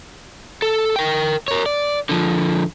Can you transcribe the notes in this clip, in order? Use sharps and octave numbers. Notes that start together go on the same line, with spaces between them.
A4
A#4 G5
A#4 C#5
D5
D3 F3